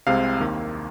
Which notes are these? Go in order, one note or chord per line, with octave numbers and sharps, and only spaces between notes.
C2 C3 G#3 C4 F5
D#2 D#3 A#3